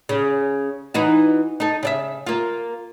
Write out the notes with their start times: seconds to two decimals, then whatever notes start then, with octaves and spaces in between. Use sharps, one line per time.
0.09 C#3
0.94 E3 D#4 F#4
1.60 D#4 A4
1.83 C#3 D5 E5
2.26 A#3 F4